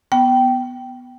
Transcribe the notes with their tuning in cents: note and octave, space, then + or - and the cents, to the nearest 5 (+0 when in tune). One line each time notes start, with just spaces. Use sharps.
B3 +0 G5 -15